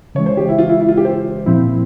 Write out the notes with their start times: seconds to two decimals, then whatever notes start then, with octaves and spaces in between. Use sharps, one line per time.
0.15 C#3 E3 G#3 C#5
0.26 C5
0.37 G4
0.49 E4
0.58 F4
0.69 E4
0.81 E4
0.88 F4
0.97 G4
1.05 C5
1.46 A#2 F3 C4 E4